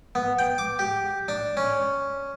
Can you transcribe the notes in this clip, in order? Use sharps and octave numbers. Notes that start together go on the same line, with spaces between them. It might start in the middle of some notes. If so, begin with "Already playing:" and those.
B3
G5
D6
G4
D4
C#4